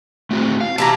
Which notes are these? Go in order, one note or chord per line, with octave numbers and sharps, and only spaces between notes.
A3 C4 F#4
F5
B2 E3 G4 A5 A#5